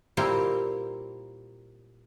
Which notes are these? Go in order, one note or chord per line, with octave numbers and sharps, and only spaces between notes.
A#2 G3 A#3 C4 E4 G4